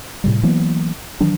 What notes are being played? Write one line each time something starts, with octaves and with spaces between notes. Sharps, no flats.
A2 C3 G3
E3 F#3 A#3 B3
D#3 E3 F#3 D4